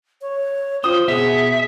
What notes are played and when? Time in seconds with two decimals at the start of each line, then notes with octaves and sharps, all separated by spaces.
0.22 C#5
0.84 F4 C5 D#6
1.08 B2 B3 G#4 E5